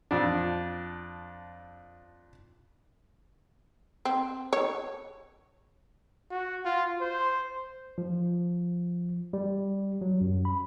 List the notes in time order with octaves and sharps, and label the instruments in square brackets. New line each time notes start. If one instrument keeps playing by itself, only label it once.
[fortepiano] F2 D4
[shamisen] C4
C#5
[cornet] F#4
F4
C5
[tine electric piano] F3
G3
F#3
F#2
B5